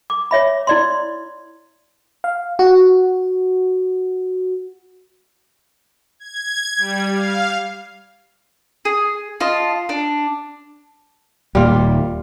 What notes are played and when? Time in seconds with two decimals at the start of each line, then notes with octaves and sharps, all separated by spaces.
0.10 D6
0.31 C#5 E5 B5
0.67 E4 D5 C6
2.24 F5
2.59 F#4
6.19 G#6
6.78 G3
7.13 F5
8.85 G#4
9.41 F4 D#5 A5
9.89 D4
11.55 D#1 A#2 G3 F4